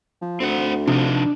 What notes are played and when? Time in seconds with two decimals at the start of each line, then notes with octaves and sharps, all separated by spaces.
0.21 F3
0.40 D2 C4 F#5
0.88 C3 F3 D4 D#4